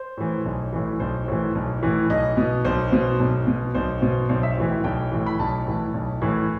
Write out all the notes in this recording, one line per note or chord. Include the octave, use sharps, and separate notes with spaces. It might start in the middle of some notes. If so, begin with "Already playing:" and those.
Already playing: C5
A2 E3
B1
A2 E3
B1 C5
A2 E3
B1
A2 E3
B1 D#5
B2
B1 C5
B2
B1
B2
B1 C5
B2
B1 C5
E5
A2 E3
G5
B1 G5
A2 E3
B5
B1 A5
A2 E3
B1
A2 E3